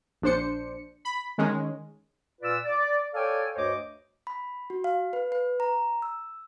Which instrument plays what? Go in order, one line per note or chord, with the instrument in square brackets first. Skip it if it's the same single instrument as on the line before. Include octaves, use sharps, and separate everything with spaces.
[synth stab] A#1 D4 C5 C#7
B5
D#3 G#3 C#4
[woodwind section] A#2 F4 B4 D5 E6
D5
A4 C#5 D5 F5 G5 G#5
D2 G2 C5 C#5 D#5 D6
[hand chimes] B5
F#4
F5
B4
B4
A#5
E6